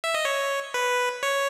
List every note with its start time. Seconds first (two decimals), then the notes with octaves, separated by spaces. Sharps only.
0.04 E5
0.14 D#5
0.25 C#5
0.74 B4
1.23 C#5